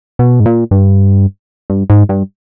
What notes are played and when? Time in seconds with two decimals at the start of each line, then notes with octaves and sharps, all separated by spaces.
0.19 B2
0.40 G#2
0.46 A#2
0.71 G2
1.70 G2
1.90 G#2
2.09 G2